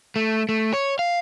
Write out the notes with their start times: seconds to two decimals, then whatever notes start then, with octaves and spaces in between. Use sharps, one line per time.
0.16 A3
0.49 A3
0.73 C#5
0.99 F5